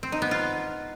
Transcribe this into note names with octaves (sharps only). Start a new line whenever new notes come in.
C4
D#4
B3
F4